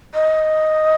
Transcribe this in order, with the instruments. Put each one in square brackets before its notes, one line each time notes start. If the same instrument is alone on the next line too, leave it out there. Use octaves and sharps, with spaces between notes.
[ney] D#5